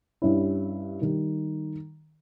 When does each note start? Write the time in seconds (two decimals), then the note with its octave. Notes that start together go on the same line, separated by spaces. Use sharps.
0.22 G2 G3 C#4 E4
1.02 D#3 G3